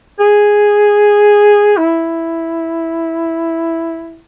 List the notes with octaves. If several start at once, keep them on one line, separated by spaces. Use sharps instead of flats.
G#4
E4